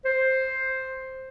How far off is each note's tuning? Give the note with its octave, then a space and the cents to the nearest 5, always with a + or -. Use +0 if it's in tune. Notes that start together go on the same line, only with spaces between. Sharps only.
C5 +5